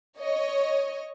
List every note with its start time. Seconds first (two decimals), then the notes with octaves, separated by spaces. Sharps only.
0.19 C#5 D#5